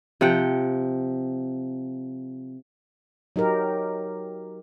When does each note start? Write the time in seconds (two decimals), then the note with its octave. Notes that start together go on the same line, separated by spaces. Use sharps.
0.21 C3 F3 F#5 G5
3.36 F#3 D#4 G4 A#4